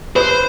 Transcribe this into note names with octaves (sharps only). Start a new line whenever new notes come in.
B4 C5